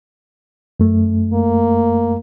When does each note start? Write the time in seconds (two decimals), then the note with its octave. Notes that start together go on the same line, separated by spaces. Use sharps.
0.80 F#2 A3
1.33 A#3